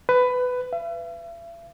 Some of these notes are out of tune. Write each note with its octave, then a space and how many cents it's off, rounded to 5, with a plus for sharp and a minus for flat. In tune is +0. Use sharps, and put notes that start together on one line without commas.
B4 +15
E5 +45